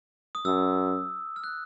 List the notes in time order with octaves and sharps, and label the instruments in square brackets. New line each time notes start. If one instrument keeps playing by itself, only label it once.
[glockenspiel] D#6
[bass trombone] F#2 [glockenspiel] E6
[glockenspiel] F6
F#6